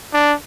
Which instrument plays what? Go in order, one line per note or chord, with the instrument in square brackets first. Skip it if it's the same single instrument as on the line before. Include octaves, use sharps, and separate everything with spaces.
[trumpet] D4